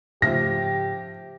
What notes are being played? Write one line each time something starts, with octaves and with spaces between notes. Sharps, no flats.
G#2 C#3 F3 A3 G4 E5 F6 A#6